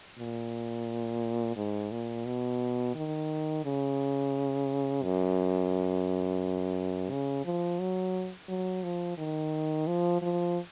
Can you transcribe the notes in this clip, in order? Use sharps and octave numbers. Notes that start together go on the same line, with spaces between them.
A#2
G#2
A#2
B2
D#3
C#3
F#2
C#3
F3
F#3
F#3
F3
D#3
F3
F3